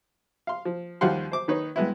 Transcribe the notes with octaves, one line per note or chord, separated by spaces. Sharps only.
F5 C6
F3
D#2 F3 G3 F5 F#5 C6
C5 D6
D#3 D#4 B4 C#5
G2 G#3 B3 E4